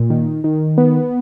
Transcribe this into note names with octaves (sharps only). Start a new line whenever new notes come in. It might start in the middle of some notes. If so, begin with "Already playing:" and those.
Already playing: A#2
D#3
D#3
B3